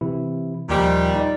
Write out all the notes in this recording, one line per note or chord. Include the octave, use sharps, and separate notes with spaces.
C3 E3 E4
D#2 A#2 D#3 F3 G3
D#4 D5